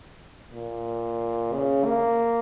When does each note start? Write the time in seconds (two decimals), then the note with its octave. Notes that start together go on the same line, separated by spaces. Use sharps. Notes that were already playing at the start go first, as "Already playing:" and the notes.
0.53 A#2
1.53 C#3
1.85 A#3